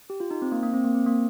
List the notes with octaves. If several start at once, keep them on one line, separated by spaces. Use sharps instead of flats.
G4
F4
D#4
C4
A#3
A#3
C4
A#3
C4
A#3